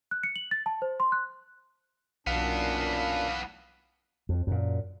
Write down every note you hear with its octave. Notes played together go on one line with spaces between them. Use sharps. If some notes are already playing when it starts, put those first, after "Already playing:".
F#6
C#7
F#7
A6
A5
C5
C6
F#6
B1 F#2 A#2 E3 B3 D4 F5
F2
F#2 A#2